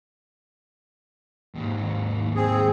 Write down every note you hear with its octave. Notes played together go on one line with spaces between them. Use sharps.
D#2 G#2
C4 G#4